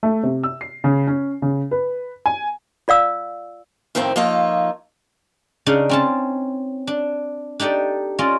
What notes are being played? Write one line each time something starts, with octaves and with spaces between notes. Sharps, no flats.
A3
C3
E6
C7
C#3
C#4
C#3
B4
G#5
F4 D5 F5 E6
F2 A2 D#3 F3 C4
F3 A#3 D#4 F4 A4 C#5
C#3 D4 D#4 F5
C4 C#4 A5
D4
D4 D#4 G4 A4 D5
C#4 F4 D5 D#5